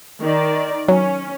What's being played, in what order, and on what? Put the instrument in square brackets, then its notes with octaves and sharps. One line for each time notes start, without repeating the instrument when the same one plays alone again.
[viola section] D#3 D5
[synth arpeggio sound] F#3 [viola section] C#4